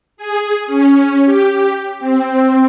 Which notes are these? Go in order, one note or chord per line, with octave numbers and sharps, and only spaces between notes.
G#4
C#4
G4
C4